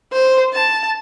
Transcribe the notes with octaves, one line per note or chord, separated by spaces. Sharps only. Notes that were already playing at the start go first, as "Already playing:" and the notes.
C5
A5